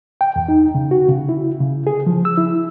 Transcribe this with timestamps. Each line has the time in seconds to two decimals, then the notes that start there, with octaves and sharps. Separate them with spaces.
0.21 G5
0.36 E2
0.48 D#4
0.75 C#3
0.91 F#4
1.09 C#3
1.29 E4
1.60 C#3
1.87 G#4
2.06 F3
2.25 E6
2.37 E4